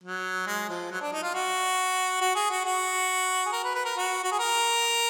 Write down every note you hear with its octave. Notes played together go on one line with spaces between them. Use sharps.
F#3
G#3
F3
F#3
D4
D#4
F4
F#4
F#4
G#4
F#4
F#4
G#4
A#4
B4
B4
A#4
F#4
F#4
G#4
A#4